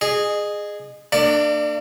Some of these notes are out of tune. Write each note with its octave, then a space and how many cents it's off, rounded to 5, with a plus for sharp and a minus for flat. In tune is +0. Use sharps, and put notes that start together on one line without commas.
G#4 +0 D#5 -30
A#3 -45 D4 +20 D5 +0